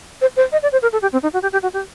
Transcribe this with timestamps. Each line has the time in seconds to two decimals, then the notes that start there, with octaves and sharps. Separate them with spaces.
0.21 C5
0.37 C5
0.52 D#5
0.63 D5
0.72 C5
0.82 A#4
0.93 A4
1.02 G4
1.13 C4
1.23 D#4
1.34 F#4
1.42 G4
1.53 G4
1.63 F#4
1.73 G4